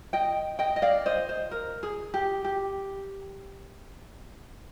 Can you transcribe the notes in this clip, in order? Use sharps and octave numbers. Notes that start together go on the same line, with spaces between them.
D#5 G5
D#5 G5
D#5
D5 F5
C5 D#5
C5
A#4
G#4
G4
G4